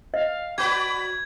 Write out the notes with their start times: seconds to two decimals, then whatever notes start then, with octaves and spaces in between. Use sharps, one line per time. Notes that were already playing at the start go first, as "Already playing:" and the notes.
0.14 D#5 F5
0.58 F#4 B4 D5 B5 G#6